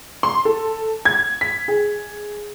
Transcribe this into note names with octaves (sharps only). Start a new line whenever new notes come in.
C6
A4
G#6
B6
G#4